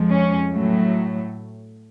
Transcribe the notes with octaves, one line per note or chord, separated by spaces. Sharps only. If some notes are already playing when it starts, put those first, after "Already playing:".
Already playing: F2 F3 G#3
C#4
A2 F#3 A3